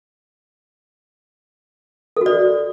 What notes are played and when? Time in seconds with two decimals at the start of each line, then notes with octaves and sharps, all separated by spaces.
2.17 A4
2.21 F#4
2.26 D5